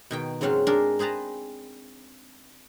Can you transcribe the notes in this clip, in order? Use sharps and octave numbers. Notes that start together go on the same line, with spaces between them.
B2 D#3 G5
G#2 C#3 F#3 C4 F5 F#5
D4 D#4 G#4 A#4
C4 G#4 B4 A5 A#5